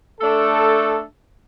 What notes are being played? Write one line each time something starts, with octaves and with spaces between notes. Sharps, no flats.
A3 D4 A4